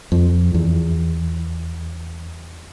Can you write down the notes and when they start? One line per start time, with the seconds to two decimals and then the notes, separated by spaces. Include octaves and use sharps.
0.12 F2
0.54 E2